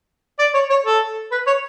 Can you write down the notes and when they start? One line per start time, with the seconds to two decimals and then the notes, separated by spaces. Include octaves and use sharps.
0.39 D5
0.54 C#5
0.70 C#5
0.85 A4
1.31 B4
1.47 C#5